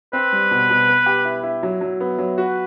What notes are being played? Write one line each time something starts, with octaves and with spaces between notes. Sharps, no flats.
C4 B4
G3
B2
B2
B3
G4
E4
E4
F#3
F#3
B3
F#3
F#4 B4